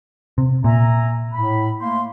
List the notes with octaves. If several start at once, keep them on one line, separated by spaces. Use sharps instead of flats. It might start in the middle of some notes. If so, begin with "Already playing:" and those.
C3
A#2 E5 G#5 A#5
A2 B5
A3 A#3 C6